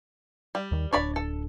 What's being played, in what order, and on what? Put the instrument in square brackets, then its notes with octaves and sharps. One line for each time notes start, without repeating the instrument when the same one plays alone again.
[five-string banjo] G3
[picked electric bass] D#2 D#3
[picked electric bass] D1 D4 [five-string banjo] C#5 D5 B5
[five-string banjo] A4